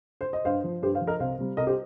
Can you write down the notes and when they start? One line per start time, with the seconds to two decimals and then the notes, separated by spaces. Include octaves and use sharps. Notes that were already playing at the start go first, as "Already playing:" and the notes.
0.21 C5
0.33 D#5
0.45 G2 C5 F5
0.64 F3
0.82 G2 G4 C5
0.95 C5 F5
1.01 F3
1.07 A#4 D#5
1.20 C2 C5 F5
1.38 C3 G3
1.57 C2 A#4 D#5
1.67 G4 C5